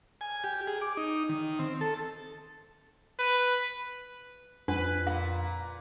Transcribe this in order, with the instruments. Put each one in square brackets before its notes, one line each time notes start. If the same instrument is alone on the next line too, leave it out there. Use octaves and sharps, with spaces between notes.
[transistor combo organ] G#5
G4
G#4
D6
D#4
D#3
C4
A4
[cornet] B4
[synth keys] F2 [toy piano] D4 [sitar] B4
[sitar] A#2 [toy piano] F5